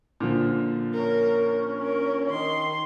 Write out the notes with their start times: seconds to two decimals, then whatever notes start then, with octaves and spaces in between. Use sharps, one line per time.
0.20 A#2 D3 F3
0.94 C#4 A#4
1.82 A#4
2.30 D#3 C6